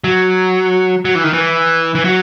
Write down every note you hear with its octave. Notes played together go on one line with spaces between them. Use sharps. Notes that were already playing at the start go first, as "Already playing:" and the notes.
F#3
F#3
E3
D#3
E3
E3
F#3